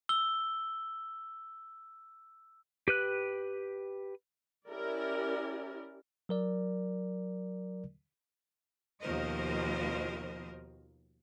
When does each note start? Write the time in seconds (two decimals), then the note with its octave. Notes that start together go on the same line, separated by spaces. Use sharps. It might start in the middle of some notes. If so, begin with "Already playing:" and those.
0.09 E6 G7
2.88 G4 B4 F#6
4.67 C#4 E4 G4 A#4 D5
6.29 F#3 A#4 D5
9.02 D#2 B2 F3 A#4 C5 D#5